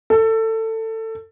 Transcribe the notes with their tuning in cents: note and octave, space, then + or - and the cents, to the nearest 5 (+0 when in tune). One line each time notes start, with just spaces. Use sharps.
A4 +20